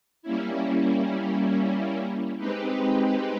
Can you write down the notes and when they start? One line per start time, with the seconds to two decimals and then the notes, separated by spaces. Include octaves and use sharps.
0.22 G3 A#3 C#4 E4
2.38 G#3 C4 D#4 G4 B4